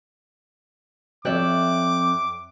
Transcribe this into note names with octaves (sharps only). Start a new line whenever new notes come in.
F2 C#5 D5 E5 G5 D6 F#6